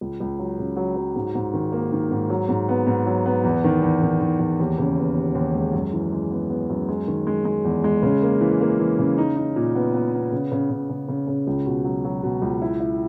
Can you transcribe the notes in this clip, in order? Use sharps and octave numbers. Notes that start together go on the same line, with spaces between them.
C#2
C#2
F#3
C#3
F#3
F#3
G#2
G#2
D#3
A#3
D#3
G#2
F#3
G#2
B3
G#2
F#3
B3
E2
D#3
E2
D#3
D#3
E2
D#2
C#3
B3
D#2
D#2
G#3
F#2
E3
G#3
B3
B3
F#2
G#3
D#3
G#3
G#3
E2
G#3
C#3
A#3
E3
A#3
E3
C#3
D#4
D#4
A#2
B3
B3
B3
C#3
C#3
C#3
C#3
C#3
C#3
C#2
B2
F#3
F#3
B2
C#2
E4
E4